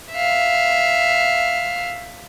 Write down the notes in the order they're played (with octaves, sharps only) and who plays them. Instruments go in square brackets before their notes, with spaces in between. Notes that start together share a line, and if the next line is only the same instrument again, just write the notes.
[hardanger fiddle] E5 F5